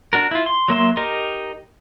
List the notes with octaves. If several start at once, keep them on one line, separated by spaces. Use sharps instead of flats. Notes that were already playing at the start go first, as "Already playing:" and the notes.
D4 F#4 A#4
E4 F4
C6
F#3 A#3 E5 C6
D#4 G4 A#4 D#5